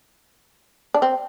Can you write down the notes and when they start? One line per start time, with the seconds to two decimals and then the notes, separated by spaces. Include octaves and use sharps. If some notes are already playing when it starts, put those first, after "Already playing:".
0.94 D4
1.02 C4